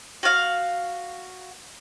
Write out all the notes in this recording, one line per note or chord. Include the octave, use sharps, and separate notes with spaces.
F#4 F5